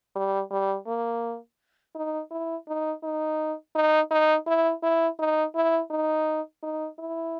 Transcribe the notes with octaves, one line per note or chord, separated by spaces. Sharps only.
G3
G3
A#3
D#4
E4
D#4
D#4
D#4
D#4
E4
E4
D#4
E4
D#4
D#4
E4